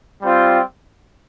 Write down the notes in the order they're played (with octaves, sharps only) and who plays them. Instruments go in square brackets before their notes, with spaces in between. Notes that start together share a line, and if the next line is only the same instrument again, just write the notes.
[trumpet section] G3 C4 F4